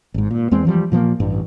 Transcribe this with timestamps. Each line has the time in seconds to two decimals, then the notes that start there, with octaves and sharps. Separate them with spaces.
0.14 G#1 G#2
0.31 A#2
0.51 E2 G#3 C4
0.65 E3 F3 G3
0.92 A#2 F3 A3 A#3
1.20 A1 G2